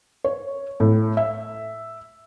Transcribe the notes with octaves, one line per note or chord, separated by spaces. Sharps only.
C#5
A2
E5